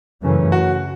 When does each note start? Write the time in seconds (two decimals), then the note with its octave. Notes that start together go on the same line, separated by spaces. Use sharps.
0.22 F#2 C#3 E3 A3 C#4
0.52 F#4